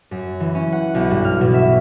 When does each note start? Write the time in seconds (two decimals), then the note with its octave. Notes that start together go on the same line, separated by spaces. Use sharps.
0.11 F#2
0.40 E3
0.55 C#4
0.72 F#5
0.95 B1
1.11 G2
1.25 F6
1.41 B2
1.54 E5